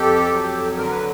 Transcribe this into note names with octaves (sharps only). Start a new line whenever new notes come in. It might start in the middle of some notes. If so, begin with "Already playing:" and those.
Already playing: F2 G4 A4
F#3
D3 A#4
B4